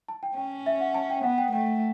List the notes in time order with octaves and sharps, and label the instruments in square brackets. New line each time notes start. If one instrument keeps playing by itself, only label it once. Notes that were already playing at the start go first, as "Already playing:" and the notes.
[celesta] A5
G5
[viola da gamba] C#4 [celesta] G5
[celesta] E5
F#5
A5
G5
[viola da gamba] B3 [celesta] F#5
[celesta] G5
[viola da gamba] A3 [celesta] G5